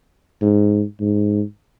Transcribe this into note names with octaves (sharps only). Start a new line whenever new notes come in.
G#2
G#2